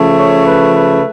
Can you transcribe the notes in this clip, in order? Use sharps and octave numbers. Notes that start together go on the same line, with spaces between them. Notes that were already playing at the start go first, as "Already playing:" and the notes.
Already playing: C#3 F3 A3
C#5
B4
B4